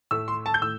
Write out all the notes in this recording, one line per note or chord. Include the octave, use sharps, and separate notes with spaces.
A2 A3 E6
C6
A5
G6
A2 E6